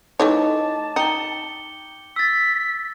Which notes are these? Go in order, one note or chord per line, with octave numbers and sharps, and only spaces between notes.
E3 A3 D#4 C#5 A5 D6
D#4 G5 C#7 G7
E6 A6 B6